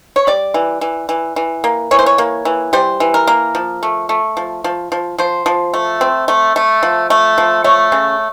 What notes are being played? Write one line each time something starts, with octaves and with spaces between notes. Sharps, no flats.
C#5
G3 D5
E3
E3
E3
E3
A#3
E3 C#5
C5
C#5
A#3
E3
G3 C5
E3
A#4
A#3
F3
A3
A3
F3
F3
F3
F3 C5
F3
A3
C4
A3
A3
F3
A3
F3
A3 C#5
C#3